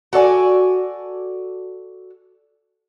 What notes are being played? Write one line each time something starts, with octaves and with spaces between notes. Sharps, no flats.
F#4 A4 D5 G#5